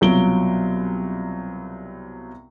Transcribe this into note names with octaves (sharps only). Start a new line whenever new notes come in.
C2 B2 F#3 F4 D7 G7